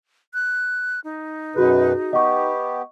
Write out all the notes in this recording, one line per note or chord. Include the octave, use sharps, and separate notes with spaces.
F#6
D#4
F#2 B2 F#4 G#4 B4
B3 G4 D#5 C#6